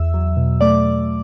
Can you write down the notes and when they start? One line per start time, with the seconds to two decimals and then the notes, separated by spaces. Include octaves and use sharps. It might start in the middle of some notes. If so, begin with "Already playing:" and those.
Already playing: E2 E5 E6
0.14 F#3
0.37 B2
0.61 A3 D5 D6